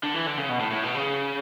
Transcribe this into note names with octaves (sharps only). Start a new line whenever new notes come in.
D3
E3
D3
C#3
B2
A2
A2
B2
C#3